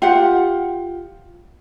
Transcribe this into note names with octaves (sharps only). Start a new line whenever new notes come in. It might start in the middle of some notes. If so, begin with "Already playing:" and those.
F4 G4 F#5